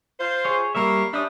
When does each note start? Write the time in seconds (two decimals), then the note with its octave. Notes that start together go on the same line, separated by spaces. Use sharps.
0.20 F4 C5
0.45 G#4 C#5
0.75 G3 A#3 C#5 E5
1.13 G3 C#4 D4 E5 D#6